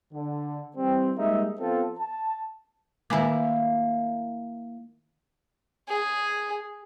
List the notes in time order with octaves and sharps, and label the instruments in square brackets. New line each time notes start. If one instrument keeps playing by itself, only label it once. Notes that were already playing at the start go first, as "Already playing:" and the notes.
[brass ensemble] D3
E3 G3 C4
G3 G#3 A#3 D#4 E5
F3 B3 C4 F4 A4
A5
[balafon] D#3 G#5 D6 [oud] A#3 E4
[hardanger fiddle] G#4